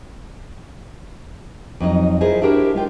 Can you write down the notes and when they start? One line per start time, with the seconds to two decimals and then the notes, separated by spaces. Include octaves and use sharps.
1.80 F2 F#3 D#4 D#5
2.21 E4 F4 G#4 A#4 C5 D#5
2.41 D4 E4 F#4 G4 A#4 C5
2.74 G#3 F4 G5